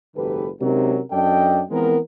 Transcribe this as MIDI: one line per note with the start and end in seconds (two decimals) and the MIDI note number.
0.16 0.49 30
0.16 0.49 44
0.16 0.49 51
0.16 0.49 67
0.16 0.49 69
0.16 0.49 71
0.60 1.00 48
0.60 1.00 54
0.60 1.00 56
0.60 1.00 61
0.60 1.00 63
0.60 1.00 70
1.11 1.61 42
1.11 1.61 62
1.11 1.61 69
1.11 1.61 75
1.11 1.61 79
1.70 1.98 52
1.70 1.98 53
1.70 1.98 56
1.70 1.98 59
1.70 1.98 60
1.70 1.98 70